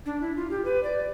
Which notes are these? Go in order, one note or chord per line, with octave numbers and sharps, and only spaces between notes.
D4
E4
F4
G4
B4
D5